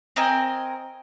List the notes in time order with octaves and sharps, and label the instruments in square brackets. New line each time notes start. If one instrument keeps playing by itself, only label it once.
[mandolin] C4 A#4 D#5 G#5